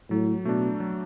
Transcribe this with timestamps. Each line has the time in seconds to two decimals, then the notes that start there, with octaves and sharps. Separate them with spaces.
0.10 A2 F#3
0.45 B2 A3 D4
0.80 F#3